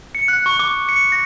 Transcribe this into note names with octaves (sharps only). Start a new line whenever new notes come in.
C#7
F#6
C#6
D6
C#7
A#6